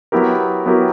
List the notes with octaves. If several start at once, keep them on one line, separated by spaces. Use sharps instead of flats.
F#3 B3 E4 G4 A#4
F#3 B3 E4 G4 A#4